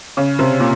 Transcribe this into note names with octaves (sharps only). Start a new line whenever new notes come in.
C#3
C3
A#2